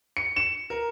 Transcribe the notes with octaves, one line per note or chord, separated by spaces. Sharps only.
C#7
E7
A#4